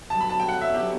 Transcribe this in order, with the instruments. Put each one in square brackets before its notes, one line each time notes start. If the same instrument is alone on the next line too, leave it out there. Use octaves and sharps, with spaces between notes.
[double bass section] D3 F#3 B3 [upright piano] A5
[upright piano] B5
A5
G5
F#5
E5
G4